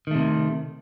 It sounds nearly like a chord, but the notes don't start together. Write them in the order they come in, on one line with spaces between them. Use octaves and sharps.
D#3 A3 C3